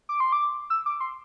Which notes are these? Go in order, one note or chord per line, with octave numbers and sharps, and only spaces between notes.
D6
C6
D6
E6
D6
C6